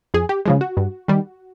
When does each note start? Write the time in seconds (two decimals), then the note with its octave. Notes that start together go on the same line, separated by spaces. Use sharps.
0.14 F2 G#4
0.29 G4
0.46 C#3 F3 G#3
0.61 F#4
0.77 G2
1.08 D#3 G3